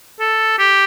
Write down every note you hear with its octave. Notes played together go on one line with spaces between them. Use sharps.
A4
G4